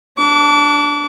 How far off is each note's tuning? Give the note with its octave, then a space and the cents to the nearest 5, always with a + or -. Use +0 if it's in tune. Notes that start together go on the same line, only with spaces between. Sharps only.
D4 +0 D6 -35